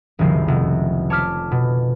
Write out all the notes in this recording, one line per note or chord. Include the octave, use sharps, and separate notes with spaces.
F#1 C2 D#3 F3 G#3 C7
F1
C#5 A5 D6 F6 B6
B2